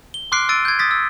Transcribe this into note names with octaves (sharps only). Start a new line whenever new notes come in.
G7
C6 D6 F6 F#6 C7 D7
E6 A6 D7 D#7
G6 G#6
D#6 A6 B6
E6